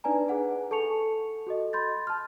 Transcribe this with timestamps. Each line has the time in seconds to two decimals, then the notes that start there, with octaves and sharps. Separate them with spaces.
0.04 D4 D#4 B4 D5 G#5 A#5
0.28 G#4 B4 F#5 G#5
0.71 A4 A5 C#6 C#7 F7
1.47 F#4 A4 D#5
1.73 B5 C6 G6 A6
2.07 A5 F6